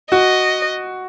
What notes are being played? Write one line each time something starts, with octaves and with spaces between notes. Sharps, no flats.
F#4 D#5